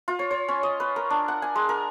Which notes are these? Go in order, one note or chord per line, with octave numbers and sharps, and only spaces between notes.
F4
C#5
C#5
C#4
D#5
B4
A#4
D4
F#5
G#5
G#3
A#4